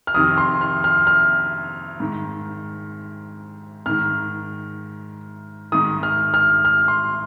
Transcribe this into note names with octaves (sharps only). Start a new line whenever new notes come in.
F6
F2 C3 D#3 D#6
C6
F6
F6
F6
G#2 D#3
G#2 D#3 F6
G#2 D#3 D#6
F6
F6
F6
C6